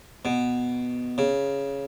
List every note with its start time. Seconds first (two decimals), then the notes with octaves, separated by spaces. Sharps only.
0.25 B2
1.18 C#3